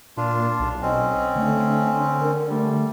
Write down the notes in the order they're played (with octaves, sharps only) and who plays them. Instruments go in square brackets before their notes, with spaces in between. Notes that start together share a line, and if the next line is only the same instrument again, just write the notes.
[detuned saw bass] A#2 [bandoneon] D4 F4
[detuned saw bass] B1
[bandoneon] C4 C#4 [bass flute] D#5
[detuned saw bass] D3 [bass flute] A3
[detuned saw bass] D3 [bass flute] A#4
[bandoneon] G3 [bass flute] A3